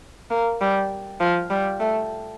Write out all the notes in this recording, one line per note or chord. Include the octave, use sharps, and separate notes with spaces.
A#3
G3
F3
G3
A3